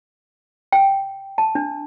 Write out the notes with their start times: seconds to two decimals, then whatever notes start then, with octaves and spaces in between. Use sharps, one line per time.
0.72 G5
1.38 A5
1.55 D4